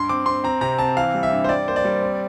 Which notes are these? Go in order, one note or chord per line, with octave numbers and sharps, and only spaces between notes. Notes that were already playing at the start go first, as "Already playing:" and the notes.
Already playing: G2 C6
C4 D6
C4 C6
C4 A#5
C3 A#5
C4 A5
E3 F5
G3
E5
G2
C5
G3 D5
A#3 C5
D5
G3
C4